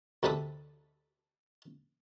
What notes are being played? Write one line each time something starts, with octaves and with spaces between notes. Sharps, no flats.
D2 C3 D4 A4 B5 D#6